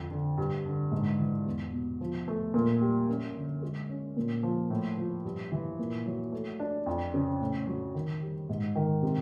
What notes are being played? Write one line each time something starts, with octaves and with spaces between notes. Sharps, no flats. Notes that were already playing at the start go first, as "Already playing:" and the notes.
Already playing: F2 D3
D3
G2
D3
G#2
E3
E2
B2
F3
A3
A#2
G3
F#2
D3
G#3
C#4
A#2
F3
A2
F3
G2
E3
A#2
F#3
A3
D4
F2
C#3
A2
F#3
D#3
G3
G#2
D#3
C3